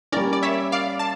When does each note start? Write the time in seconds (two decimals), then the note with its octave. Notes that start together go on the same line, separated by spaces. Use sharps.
0.12 G3 A#3 C#4 A#4 D5
0.33 D5
0.43 C#5 E5
0.72 D5 F5
0.99 A5